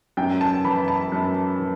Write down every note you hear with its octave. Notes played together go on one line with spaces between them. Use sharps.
F#2 G5
A5
E3 B5
A5
F#2
E3